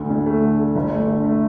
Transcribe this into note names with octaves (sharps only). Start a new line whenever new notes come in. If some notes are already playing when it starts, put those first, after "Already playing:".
Already playing: D2 D3
D2
A3
D3
A3
G1
A3
D3
A3